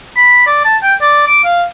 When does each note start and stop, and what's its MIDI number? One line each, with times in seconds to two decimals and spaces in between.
0.16 0.46 83
0.47 0.65 74
0.65 0.77 81
0.83 0.95 79
1.02 1.24 74
1.28 1.44 86
1.44 1.64 77